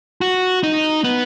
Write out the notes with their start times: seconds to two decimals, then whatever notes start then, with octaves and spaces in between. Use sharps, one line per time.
0.21 F#4
0.63 D#4
1.04 B3